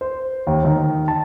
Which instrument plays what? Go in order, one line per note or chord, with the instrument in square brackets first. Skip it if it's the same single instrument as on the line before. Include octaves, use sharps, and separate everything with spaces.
[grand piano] C5
D#2
D#3
A5